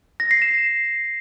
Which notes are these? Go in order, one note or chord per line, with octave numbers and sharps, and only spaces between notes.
A#6
C7
E7